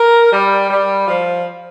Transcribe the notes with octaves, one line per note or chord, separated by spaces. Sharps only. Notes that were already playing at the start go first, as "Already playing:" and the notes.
Already playing: A#4
G3
G3
F3